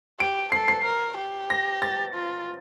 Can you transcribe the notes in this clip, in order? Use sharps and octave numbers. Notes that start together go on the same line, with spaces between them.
G4 D7
A4 C7
C7
A#4
G4
A#6
A6
F4